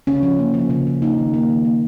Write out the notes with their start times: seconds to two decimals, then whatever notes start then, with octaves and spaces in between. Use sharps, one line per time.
0.07 C#3 C#4
0.23 F3
0.39 A#3
0.54 F3
0.70 C#3
0.87 F3
1.02 A#3 D#4
1.18 D#3
1.34 A#3
1.49 D#3
1.65 A#3